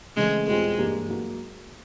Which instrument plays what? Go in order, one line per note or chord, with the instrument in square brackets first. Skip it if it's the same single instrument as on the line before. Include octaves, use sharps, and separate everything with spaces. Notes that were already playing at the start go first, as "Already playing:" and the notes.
[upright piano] C#3 E3 A3 C4 [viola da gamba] G#3
[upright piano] E2 B2 G3 C4 F4 [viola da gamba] G#3
[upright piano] G2 E3 G3 A#3
F#3 A#3